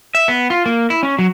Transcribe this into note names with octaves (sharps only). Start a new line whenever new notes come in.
E5
B3
F4
A#3
E4
C#4
F#3